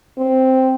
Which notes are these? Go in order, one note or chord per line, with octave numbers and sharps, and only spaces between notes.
C4